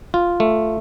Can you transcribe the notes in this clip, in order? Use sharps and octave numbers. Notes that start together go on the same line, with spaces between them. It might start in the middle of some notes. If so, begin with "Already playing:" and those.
F4
A3